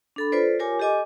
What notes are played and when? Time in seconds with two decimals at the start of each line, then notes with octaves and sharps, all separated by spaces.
0.16 D4 A4 B5
0.32 F4 A4 B4 C5 D5
0.59 F4 G4 A#4 C#5 G#5 D6
0.80 G4 A4 D#5 G#5 D6